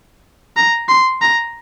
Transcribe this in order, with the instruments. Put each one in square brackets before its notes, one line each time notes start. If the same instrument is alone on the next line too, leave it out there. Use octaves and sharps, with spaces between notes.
[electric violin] A#5
C6
A#5